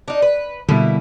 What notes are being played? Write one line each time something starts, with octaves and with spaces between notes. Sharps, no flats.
D4 D#4
B4
B2 D3 G3 A#3 E4